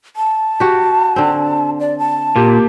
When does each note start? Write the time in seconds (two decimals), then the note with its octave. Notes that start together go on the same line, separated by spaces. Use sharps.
0.16 A5
0.60 F#4 G4
1.16 D3 C4
1.80 D5
1.98 A5
2.36 A#2 A#3 G4